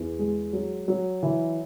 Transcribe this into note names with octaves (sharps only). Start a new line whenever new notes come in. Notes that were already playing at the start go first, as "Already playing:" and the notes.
Already playing: E2
G#3
F#3
F#3
E3